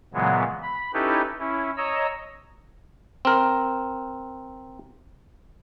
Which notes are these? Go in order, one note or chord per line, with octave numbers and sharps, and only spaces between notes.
A#2 C#3 E3 F#3 G#3 B3
B5
C#4 D#4 E4 G4 A4 B4
C#4 E4
C#5 D#5 A#5 E6
C4 A#4